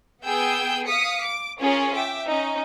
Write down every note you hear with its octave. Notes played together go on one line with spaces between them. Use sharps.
B3 G#4 G5 E6 G6
F5 D#6 B6 C#7
D6
C#4 F4 G#4 A#4 C#5
E5 G5 D6
C#4 D#4